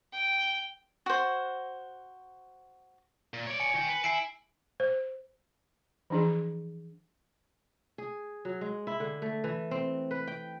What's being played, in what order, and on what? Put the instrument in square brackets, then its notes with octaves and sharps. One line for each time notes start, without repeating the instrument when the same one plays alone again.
[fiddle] G5
[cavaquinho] F#4 C5
[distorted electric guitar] A#2
C#5 D5
[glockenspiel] G#5 C#7
[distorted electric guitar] D#3 G5
B4
[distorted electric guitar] E4 [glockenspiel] G#5 C7 D7
[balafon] C5
E3 F3 D4 E4 G#4
[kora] G#4
F#3
G#3
E4
D3
A3
E3
C4
B4
G5